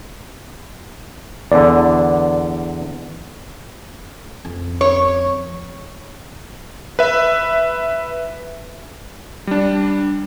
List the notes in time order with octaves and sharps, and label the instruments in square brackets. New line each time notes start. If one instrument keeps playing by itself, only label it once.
[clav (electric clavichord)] E2 D3 [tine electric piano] D5
[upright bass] F2
[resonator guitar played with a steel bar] C#5
[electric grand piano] B4 E5
G3 D4